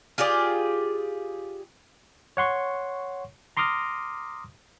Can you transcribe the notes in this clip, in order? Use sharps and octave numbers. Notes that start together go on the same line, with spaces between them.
F4 G4 G#4 D5
C#5 F#5 C6 C#6
A#5 C6 D6 D#6 F6 A#6